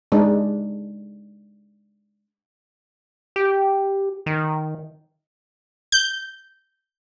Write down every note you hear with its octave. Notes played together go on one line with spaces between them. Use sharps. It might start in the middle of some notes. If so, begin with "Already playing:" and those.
G#3 D4 D#4
G4
D#3
G6